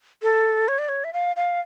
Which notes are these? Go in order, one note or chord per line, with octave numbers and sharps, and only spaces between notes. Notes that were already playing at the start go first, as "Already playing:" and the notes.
A4
C#5
D5
C#5
E5
F5
F5